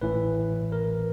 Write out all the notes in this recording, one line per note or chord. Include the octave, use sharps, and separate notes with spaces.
A1 A2 E3 A3 B4
A#4